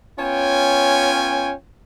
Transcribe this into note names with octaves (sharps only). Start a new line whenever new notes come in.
B3 C#4 F4 C#5 G5 G#5